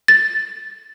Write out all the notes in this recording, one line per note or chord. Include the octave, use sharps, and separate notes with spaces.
A6